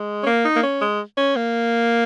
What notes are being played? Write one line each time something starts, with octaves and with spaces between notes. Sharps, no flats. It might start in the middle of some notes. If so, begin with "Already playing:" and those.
Already playing: G#3
C#4
A#3
D#4
A#3
C#4
G#3
C#4
A#3